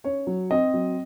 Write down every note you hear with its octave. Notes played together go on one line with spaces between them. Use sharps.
C#4 C#5
F#3
C4 D#5
F#3